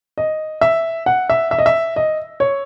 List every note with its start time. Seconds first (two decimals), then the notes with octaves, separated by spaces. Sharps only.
0.18 D#5
0.61 E5
1.06 F#5
1.30 E5
1.51 E5
1.58 D#5
1.66 E5
1.96 D#5
2.40 C#5